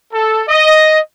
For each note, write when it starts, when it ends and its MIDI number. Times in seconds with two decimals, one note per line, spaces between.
0.13 0.42 69
0.48 0.99 75